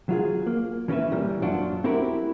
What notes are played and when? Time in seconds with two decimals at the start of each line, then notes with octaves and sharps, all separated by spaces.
0.09 F#3 F4 G#4
0.47 A#3
0.88 E3 C#4 A4 B4 E5
1.12 A#2 E3 G3
1.42 F#2 F#3 D4 F4
1.84 C4 E4 F#4 G4 A#4